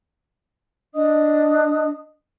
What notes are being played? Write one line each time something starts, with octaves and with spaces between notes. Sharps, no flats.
D4 D#5 D#6